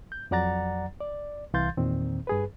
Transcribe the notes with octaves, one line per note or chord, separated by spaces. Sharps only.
G6
F2 F#3 D5 F#5 A#5 A6
D5
C2 E3 F5 C6 G6 A6
E2 A#2 D#3 C4
G2 G#4 B4